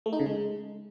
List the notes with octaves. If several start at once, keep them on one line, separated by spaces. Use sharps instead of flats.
A3
D#4
C#3
G#3